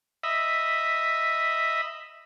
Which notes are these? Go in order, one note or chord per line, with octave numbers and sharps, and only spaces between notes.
D#5 E5 B5